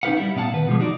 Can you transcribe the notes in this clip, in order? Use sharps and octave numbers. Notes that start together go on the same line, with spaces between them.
C#4 D#4 F#4 B4 F5 F#5
G3 E4
A#2 B3 F5 F#5 A5
D#3 B4
B2 F3 G3 G#3
D#4 F#4 D5